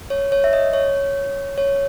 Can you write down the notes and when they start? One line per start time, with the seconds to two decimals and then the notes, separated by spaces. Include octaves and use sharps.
0.10 C#5
0.32 C#5
0.44 E5
0.53 D#5
0.73 C#5
1.58 C#5